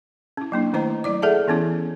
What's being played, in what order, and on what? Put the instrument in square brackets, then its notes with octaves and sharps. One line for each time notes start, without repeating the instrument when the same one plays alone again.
[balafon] C#4 E4
F#3 A#3 D4 E4
D#3 A3 E4 C5 D#5 A#5
F#3 E4 D5 D6
G#4 A4 D5 E5 F#5 A5
E3 B3 C#4 E4